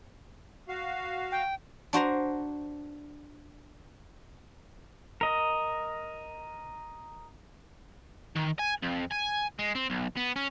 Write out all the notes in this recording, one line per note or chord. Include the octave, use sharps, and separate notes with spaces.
F#4 F5
G5
D4 F#4 C5 A#5
A#4 D#5
D#3
G#5
F2
G#5
G#3
C4
B1
B3
C#4